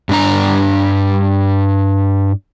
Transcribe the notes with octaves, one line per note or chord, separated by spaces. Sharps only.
G2 D4 A#5